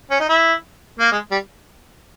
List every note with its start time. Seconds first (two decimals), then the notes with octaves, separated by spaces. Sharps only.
0.11 C#4
0.20 D#4
0.29 E4
1.00 A#3
1.12 G#3
1.31 G3